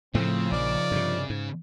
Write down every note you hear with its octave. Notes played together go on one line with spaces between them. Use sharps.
A2 C#3 F3 A3 C4
A#1 D#4 A#4 D5
G2 C3
G#2